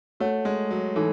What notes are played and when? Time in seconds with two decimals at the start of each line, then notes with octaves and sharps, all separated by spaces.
0.20 A3 F#4 C#5 F#5
0.45 G#3
0.71 F#3
0.96 E3 D#4 F#4 A4